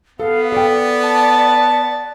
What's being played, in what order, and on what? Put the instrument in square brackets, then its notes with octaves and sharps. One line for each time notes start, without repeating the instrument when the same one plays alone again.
[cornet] B3 [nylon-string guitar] A4 [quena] F5
[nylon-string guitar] A4 G5 [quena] D5
[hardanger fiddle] A5